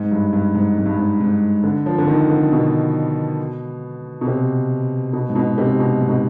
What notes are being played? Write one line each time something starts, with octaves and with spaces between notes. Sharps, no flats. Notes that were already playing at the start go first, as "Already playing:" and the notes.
Already playing: G#2
G2
G2
G#2
G#2
G2
G#2
G#2
D3
F3
D3
D#3
D3
B2
B2
C3
B2
G#2
B2
C3
B2
G#2
B2